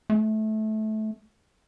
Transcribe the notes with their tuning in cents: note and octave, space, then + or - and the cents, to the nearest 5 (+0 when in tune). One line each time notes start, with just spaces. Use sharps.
A3 -20